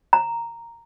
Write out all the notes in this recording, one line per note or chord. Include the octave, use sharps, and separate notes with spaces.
A#5